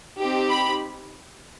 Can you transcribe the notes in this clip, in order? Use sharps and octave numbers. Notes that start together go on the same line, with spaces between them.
C4 D#4 G4
B5